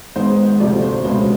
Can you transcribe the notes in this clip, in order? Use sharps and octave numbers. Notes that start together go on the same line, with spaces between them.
G#2 D#3 G#3 B3 C5
D2 C3 F3 A3 D5
C5
C#2 B2 G#3 B3 C5